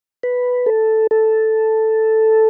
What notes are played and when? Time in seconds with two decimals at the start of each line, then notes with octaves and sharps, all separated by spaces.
0.23 B4
0.66 A4
1.11 A4